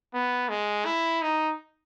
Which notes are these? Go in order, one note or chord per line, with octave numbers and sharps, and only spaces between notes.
B3
G#3
E4
D#4